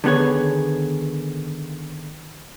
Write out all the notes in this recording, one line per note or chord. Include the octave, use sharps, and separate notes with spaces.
D3 D#3 B3 G#4 C#5